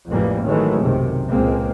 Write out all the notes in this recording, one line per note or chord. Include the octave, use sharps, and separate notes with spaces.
A1 F2 E3 G3 G#3 A#3
D#3 E3 F#3 G#3 A3
B1 F#2 C3 D#3
C#2 A#2 G#3 A#3 C4